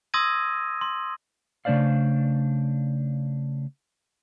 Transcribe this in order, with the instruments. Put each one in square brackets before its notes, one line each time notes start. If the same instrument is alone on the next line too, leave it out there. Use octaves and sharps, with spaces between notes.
[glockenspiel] C6 D#6 E6 G#6 A#6 D#7
C6
[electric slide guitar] C#3 A3 D4 C5 D5 F5